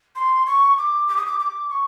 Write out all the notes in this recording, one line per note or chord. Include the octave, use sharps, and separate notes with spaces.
C6
C#6
D6
D6
D#6
D6
D6
C#6